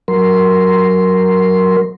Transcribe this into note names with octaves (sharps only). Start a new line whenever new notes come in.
F#3 A#4 C6